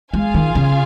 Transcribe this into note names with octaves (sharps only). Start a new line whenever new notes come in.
G#3 F4 G#4 F5 G#5
D#3
C#3